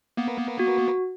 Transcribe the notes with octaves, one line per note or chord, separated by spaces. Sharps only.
A#3 B3
F#4